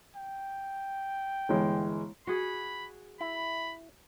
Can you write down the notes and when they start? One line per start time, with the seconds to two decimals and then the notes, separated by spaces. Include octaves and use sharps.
0.16 G5
1.49 G1 E3 G#3
2.27 F#4 G#4 B5
3.21 E4 B5